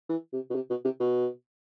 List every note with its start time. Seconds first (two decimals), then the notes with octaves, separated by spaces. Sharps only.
0.09 E3
0.33 C3
0.50 B2
0.55 C3
0.70 B2
0.84 C3
1.00 B2